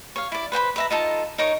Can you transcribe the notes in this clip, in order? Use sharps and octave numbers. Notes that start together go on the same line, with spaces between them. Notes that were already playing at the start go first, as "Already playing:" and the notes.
C#5 F5
E4 D5
B4 C5 G5 B5
B4 E5 A#5
D#4 F4 A4 A5
D#4 A#4 C#5 C#6